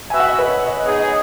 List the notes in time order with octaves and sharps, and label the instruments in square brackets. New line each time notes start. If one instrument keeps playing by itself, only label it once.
[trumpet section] F#4 B4 E5 [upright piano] G#5
[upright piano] F#5
D#5
B4
C#5
D#5
[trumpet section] B3 D#4 G#4 [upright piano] C#5
[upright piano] D#5